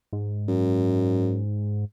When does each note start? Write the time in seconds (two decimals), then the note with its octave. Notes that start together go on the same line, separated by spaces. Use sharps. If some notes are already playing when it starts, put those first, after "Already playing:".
0.13 G#2
0.48 F#2